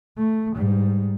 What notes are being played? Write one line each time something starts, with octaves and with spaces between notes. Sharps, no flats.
A3
G#2 G3